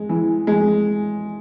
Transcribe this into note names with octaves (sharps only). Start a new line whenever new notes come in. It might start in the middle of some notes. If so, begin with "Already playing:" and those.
Already playing: G#3
E3
G#3